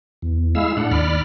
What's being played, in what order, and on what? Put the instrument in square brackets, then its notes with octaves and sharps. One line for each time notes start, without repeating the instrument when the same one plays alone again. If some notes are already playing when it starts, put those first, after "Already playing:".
[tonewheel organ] E2
G#3 E4 F5 E6
A2 D4 F#5
D#2 D5 B5 F6